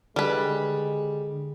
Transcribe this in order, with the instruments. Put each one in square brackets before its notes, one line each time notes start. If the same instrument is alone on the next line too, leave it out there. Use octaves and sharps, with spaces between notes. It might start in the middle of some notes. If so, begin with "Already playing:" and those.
[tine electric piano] D3 [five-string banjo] G3 B4 [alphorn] G#3